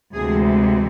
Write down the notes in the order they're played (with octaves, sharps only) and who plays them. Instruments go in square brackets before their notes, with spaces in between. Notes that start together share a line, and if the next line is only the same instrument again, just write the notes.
[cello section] D2 C3 E3 G#3 G#4